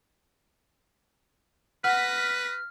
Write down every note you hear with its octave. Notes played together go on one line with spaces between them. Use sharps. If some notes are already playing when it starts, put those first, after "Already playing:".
B4 F#5 F6 A#6 B6